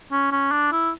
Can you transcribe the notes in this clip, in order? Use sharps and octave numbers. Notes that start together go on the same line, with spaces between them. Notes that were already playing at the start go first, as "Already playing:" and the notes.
C#4
C#4
D4
E4